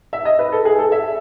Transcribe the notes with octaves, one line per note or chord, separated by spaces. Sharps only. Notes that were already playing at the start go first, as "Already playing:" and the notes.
E5
D#5
B4
A4
G#4
A4
E5